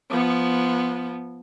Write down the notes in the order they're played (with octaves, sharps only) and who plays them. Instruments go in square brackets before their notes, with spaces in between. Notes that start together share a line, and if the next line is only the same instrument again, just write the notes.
[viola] F3 B3